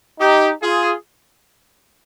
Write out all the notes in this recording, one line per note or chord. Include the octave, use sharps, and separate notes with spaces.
D#4 G4
F4 G#4